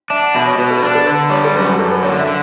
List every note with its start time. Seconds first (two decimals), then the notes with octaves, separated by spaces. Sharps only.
0.10 D4 E5
0.22 F#5
0.35 B2 E5
0.46 C#5
0.58 B2 B4
0.70 A4
0.82 D4 B4
0.95 A4
1.06 D3 B4
1.30 G3 C#5
1.45 A4
1.55 F#2 B4
1.67 B4
1.79 F#2 A4
1.91 B4
2.03 D3 C#5
2.19 E5
2.27 D3